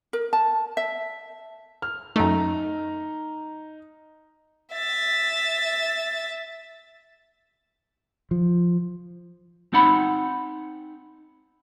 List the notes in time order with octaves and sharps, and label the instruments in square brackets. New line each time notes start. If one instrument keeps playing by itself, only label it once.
[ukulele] A#4
A5
E5
[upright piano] F6
[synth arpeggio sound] F#2 A3 [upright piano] D#4 A#5
[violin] E5 A6
[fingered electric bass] F3
[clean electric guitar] C4 D#4 F#5 B5